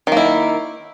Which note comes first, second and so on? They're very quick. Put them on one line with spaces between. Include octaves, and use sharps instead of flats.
D#3 A#3 E4